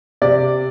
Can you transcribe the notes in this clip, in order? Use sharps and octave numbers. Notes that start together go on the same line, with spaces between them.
C3 D5